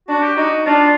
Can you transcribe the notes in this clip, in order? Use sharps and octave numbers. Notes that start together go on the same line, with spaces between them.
D4 F#4
G4
D#4 F#4
D4 F4